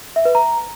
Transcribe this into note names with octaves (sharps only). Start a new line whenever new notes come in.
E5
B4
A#5